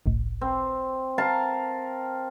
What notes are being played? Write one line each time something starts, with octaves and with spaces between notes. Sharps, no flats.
G1 C2 A2
C4
A#4 F5 A5